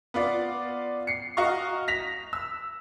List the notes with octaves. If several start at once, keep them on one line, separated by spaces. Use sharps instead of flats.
B3 F4 D5
C7 C#7
F#4 D#5 F5 A#5 C#6
A#6 B6 F7
E6